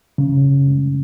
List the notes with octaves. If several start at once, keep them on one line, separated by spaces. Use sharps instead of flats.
C#3